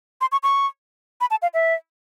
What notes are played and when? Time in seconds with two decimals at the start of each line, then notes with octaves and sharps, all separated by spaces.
0.21 C6
0.32 C#6
0.43 C#6
1.21 B5
1.31 A5
1.42 F5
1.54 E5